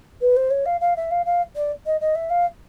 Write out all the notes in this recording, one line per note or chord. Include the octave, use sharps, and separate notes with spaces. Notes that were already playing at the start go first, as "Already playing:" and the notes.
B4
C5
C#5
F5
F5
E5
F5
F5
D5
D#5
D#5
E5
F5